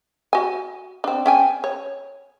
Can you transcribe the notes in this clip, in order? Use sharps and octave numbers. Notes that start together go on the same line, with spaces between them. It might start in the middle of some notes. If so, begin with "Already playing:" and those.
F#4 G#5
C4 D4
C#4 G5 G#5
C#5